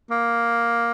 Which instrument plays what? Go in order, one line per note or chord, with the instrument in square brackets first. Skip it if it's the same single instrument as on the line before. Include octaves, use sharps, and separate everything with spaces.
[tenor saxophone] A#3